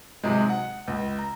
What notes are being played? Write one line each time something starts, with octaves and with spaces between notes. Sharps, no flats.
G#2 C3 F#3 G#3
F#5
C#2
A#5